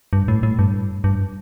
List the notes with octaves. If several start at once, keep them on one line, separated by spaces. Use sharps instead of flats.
G2
A2
A2
G2
G2